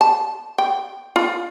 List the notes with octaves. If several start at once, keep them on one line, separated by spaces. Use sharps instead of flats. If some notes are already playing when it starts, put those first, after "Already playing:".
A5
G5
F4